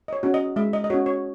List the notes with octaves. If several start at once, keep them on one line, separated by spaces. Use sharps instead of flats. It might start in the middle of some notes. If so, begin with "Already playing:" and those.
D#5
C#5
C#4 F#4
D#5
G#3 E5
D#5
D#5
C#4 F#4 C#5
C#5